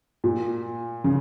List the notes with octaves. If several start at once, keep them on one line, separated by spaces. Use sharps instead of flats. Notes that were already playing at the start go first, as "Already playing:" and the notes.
A#2
C#3